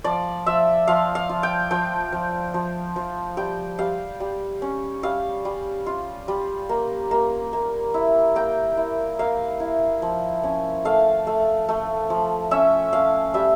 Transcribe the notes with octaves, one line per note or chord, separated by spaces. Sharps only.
F3 D5
F3 E5
F3 F5
F5
F4
G5
F3 G5
F3
F3
F3
G3 G5
G3 F5
G3
C#4
G3 F5
G3
F4
G3
A#3
A#3
A#3
E4
A#3 G5
E4
A#3 F5
E4
F3
C#4
A3 F5
A3
A3
F3
C#4 E5
C#4 F5
G3 E5